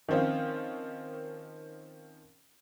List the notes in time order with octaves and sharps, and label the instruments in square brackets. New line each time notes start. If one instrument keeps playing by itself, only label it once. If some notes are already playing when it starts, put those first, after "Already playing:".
[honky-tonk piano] D#3 F3 C4 C#4 F4